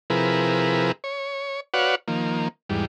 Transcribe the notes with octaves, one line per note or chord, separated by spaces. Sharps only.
C3 F3 E4 G#4 A#4 B4
C#5
F#4 B4 C#5 D5 F5 F#5
D#3 F3 A#3
E2 G#2 G3